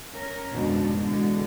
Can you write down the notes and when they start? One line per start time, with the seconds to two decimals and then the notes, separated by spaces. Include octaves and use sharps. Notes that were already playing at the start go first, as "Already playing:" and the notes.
0.11 C#4 A#4
0.51 F2 G#2 B2 D3 F3 D4
0.94 B2 D3 E3 G#3